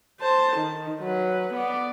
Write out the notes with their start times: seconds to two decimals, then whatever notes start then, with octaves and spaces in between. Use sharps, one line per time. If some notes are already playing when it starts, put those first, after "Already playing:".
0.21 C5 A5
0.57 D#3
1.00 F#3 B4
1.54 B3 D5